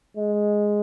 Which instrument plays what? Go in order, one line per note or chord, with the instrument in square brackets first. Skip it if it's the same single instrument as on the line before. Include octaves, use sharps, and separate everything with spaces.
[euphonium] G#3